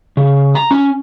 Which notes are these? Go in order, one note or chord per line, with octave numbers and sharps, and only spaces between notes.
C#3
A#5
C#4